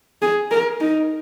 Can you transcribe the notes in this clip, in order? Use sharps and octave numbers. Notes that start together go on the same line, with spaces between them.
G#4
A#4
D#4